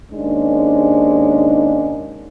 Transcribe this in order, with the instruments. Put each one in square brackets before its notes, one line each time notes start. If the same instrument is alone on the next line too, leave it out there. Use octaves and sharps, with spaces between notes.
[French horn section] D#2 G#2 G#3 C#4 D4